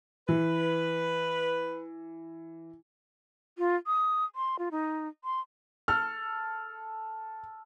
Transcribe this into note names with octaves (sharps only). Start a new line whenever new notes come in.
E3 B4
F4
D#6
C6
F4
D#4
C6
A4 F6